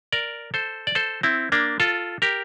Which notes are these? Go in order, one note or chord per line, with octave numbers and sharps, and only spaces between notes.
A#4 D5
A4 C5
D5
A4 C5
C4 E4
A#3 D4
F4 A4
G4 A#4